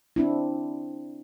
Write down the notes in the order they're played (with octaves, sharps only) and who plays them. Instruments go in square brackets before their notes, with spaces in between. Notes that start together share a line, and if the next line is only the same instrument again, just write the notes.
[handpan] C4 D4 E4